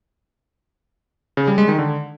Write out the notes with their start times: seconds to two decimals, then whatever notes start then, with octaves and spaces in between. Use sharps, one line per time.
1.37 C#3
1.47 G3
1.58 G#3
1.68 D#3
1.79 D3